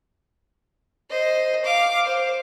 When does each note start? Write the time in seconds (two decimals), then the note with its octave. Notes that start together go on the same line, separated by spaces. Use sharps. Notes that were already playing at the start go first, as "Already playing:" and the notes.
1.10 C5 D#5
1.65 F5 D6
2.06 C5